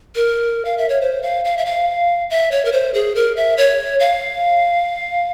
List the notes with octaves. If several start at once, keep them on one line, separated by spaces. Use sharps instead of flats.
A#4
F5
E5
C#5
C5
F5
F5
E5
F5
E5
C#5
A#4
C5
G#4
A#4
E5
C#5
F5